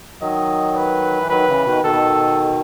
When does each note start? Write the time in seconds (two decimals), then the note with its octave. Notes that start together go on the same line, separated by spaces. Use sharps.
0.21 D#3 F#3 D#5
0.76 B4
1.19 E3
1.29 D#3 F#3 B4
1.47 C#3 E3
1.66 B2 D#3
1.84 B2 D#3 A4